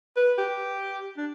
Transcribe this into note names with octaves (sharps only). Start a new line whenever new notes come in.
B4
G4
D4